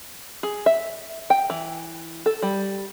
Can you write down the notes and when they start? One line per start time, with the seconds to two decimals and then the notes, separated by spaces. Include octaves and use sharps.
0.43 G#4
0.66 E5
1.30 G5
1.50 E3
2.26 A4
2.42 G3